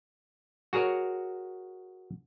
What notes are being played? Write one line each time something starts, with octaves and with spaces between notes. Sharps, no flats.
F#4 G#4 A#4 C#5